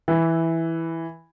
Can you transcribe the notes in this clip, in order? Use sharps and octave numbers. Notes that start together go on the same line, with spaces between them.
E3